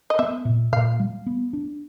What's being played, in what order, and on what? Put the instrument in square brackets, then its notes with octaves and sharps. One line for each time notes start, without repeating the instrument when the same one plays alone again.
[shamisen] D#5
[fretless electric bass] B3 [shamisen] E5
[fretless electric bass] A#2
[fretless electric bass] A#2 [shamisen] F5
[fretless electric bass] G3
B3
D4